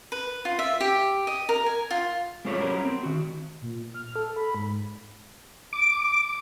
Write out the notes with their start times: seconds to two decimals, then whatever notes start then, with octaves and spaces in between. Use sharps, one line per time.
0.12 B4
0.45 F4
0.59 E5
0.80 G4
1.27 D#5
1.49 A#4
1.66 G#5
1.91 F4
2.45 G#3 C4 F4 A4 C#5 D5
2.58 F#3 G3 C#4 A#4 C5
2.85 C4
3.03 D#3 F#4
3.62 A#2
3.94 F6
4.16 A4
4.36 B5
4.55 G#2
5.73 D6